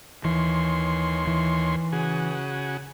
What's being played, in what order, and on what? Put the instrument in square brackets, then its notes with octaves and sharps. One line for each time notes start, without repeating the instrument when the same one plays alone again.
[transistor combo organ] D#2 C#5 C6 [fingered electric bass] E3
[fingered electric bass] E3
[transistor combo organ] C#3 F#4 G#4